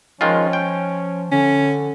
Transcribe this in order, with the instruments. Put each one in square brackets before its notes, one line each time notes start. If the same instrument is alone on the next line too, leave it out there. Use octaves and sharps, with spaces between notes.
[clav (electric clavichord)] D#3 G#3 F4 [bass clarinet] F3 [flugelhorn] C#4
[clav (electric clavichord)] G5
[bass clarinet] D3 [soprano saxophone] C#4